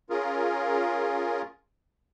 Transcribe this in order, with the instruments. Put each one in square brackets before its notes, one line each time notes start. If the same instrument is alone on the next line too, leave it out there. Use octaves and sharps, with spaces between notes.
[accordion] C#4 F4 G#4 A#4